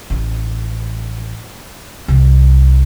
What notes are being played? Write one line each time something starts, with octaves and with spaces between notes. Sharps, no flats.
A1
C2